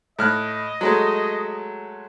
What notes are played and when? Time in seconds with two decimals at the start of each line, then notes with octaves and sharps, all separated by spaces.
0.19 A2 D#5 F6 F#6
0.81 F#3 G#3 A3